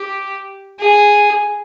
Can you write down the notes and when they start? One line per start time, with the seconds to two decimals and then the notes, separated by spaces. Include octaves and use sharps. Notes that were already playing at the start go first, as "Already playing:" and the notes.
Already playing: G4
0.80 G#4